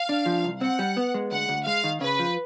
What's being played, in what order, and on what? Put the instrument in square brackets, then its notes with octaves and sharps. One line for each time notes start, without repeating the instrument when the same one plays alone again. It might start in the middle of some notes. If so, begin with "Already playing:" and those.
Already playing: [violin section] F5
[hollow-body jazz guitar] D4
F3
C2
[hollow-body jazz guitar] C4 [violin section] F#5
[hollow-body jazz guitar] G3
B3
G#3
[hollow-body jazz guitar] D2 [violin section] F#5
[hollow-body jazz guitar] D2
[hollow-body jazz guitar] G#3 [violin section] F5
[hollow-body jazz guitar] D#3
[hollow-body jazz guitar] C#3 [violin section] B4
[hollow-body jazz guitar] F3